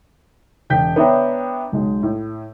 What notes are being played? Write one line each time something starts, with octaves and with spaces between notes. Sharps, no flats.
E1 G5 G6 B6
B3 D4 C#5 E5 G5 A#5
B1 G#3
A2